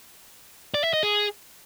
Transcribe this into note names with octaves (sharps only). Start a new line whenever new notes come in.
D5
E5
D#5
G#4